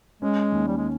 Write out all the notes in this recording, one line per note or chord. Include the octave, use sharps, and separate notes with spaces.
G#3 C#4
D#2
G3
G#3